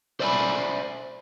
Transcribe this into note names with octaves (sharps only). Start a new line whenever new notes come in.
C5 D5 E5 G5 G#5 B5